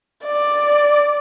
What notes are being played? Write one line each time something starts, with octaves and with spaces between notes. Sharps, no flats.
D5